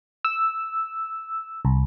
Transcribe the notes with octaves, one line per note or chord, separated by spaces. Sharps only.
E6
C2